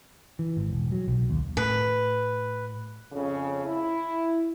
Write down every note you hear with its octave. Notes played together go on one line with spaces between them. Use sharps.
E3
G#1
E1
F#3
B1
D#2
A2 B4
F2 C#3
E4